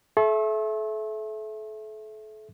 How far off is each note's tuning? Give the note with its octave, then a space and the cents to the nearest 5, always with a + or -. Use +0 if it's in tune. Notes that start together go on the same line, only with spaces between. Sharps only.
A4 -35 E5 +0 C#6 -45